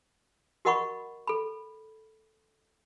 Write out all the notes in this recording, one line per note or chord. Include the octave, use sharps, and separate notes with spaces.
F#4 A#4 D#5 F#5 B5 C#6
A4 B5